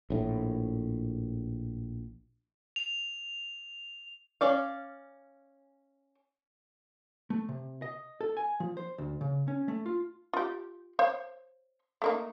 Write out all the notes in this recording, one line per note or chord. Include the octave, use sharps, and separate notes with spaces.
A#1 A2
F7
C#4 D5 F5
A3
C3
D#5
A4
G#5
F3
C5
D2
C#3
C#4
A3
F4
F4 G4
C5 C#5 F5
A3 A#3 D#4